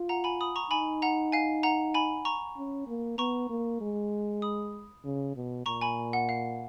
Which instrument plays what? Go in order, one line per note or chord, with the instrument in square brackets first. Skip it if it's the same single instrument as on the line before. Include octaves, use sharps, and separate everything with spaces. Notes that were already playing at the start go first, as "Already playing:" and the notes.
Already playing: [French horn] F4
[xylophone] F#5 A#5
G#5 B5
B5 D#6
A#5 C#6
[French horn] D#4 [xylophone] G#5 B5
[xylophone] F#5 A#5
F5 G#5
F#5 A#5
G#5 B5
A#5 C#6
[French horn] C#4
A#3
[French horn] B3 [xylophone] A#5 C#6
[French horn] A#3
G#3
[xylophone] B5 D#6
[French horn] C#3
B2
[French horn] A#2 [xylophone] A#5 C#6
[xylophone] G#5 B5
F#5
F5